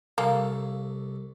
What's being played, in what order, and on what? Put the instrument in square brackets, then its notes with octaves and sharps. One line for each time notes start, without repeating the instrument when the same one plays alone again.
[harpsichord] C2 A4 [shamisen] A#3